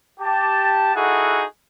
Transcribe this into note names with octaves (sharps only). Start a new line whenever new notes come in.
G4 A5
D#4 E4 F#4 G#4 A4 F#5